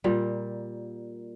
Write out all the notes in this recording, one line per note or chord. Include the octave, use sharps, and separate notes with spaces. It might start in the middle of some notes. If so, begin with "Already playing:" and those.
A#2 G3 A#3